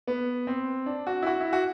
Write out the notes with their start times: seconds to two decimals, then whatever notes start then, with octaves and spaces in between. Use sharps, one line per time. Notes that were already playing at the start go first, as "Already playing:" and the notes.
0.07 B3
0.47 C4
0.86 D4
1.07 F#4
1.22 E4
1.26 F#4
1.40 E4
1.53 F#4